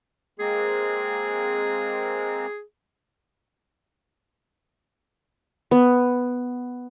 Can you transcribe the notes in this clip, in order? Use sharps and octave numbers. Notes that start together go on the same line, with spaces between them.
G#3 A#3 C4 G#4
B3